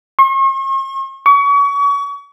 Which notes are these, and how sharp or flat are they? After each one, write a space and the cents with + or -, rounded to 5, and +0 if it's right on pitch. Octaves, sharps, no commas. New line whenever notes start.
C#6 -45
C#6 +35